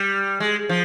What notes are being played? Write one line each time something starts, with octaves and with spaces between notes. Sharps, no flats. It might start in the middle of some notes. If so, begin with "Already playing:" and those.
Already playing: G3
G#3
F3